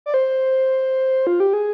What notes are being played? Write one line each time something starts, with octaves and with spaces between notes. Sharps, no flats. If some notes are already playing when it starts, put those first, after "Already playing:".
D5
C5
F4
G4
G#4